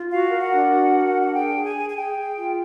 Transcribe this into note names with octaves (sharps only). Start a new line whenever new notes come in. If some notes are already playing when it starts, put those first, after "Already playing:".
Already playing: F4
F#4 F5
A#4
F#5
D4
F#4
A#4
D4
F#5
G#4 G5
G#4
G#5
G#4
G#5
G#4 G5
G#4
F4